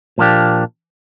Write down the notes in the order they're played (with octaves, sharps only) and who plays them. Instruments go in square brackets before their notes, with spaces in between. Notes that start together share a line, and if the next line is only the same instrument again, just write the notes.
[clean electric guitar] A#2 F3 A#3 D4 G4